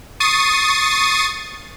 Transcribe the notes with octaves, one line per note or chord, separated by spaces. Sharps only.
C#6 D#6 A6 C7 D#7